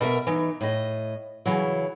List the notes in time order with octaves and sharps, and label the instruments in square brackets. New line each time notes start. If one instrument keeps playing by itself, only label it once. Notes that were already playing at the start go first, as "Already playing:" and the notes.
[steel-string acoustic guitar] B2 A#4 B4 E5
E3 D#4
A2 D#5
C#3 E3 F#3